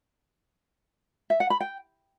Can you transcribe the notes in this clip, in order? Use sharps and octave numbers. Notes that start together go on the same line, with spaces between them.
E5
F#5
B5
G5